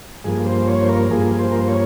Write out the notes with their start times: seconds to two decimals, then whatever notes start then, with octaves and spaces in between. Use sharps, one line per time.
0.24 G2 F3 A#3 G#4
0.46 C5
0.68 C#5
0.80 C5
0.89 A#4
1.11 G2 F3 A#3 G#4
1.39 C5
1.52 A#4
1.60 C5
1.68 C#5